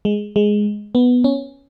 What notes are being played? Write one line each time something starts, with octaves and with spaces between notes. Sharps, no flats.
G#3
G#3
B3
C#4